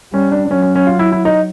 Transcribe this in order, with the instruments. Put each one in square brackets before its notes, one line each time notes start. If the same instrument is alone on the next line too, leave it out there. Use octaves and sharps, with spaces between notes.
[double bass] G3 [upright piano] C#4
[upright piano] D4
D4
[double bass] F#3 [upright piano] C#4
[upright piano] C#4
C#4
F4
E4
E4
D#4